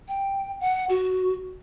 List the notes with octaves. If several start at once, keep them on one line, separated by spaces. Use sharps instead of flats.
G5
F#5
F#4